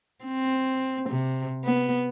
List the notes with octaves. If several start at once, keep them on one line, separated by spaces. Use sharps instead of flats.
C4
C3
B3